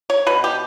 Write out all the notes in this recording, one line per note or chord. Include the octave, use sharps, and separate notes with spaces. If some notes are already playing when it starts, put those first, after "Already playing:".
C#5
B2 B4
G4